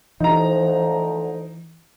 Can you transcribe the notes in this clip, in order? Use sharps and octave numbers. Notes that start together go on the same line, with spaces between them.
D2 E3 F3 D#4 A#5